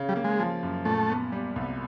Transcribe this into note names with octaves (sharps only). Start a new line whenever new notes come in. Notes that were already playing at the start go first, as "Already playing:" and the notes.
Already playing: C#3
G3
A#3
G#3
F3
F#2
A#2 A3
B3
G3
C2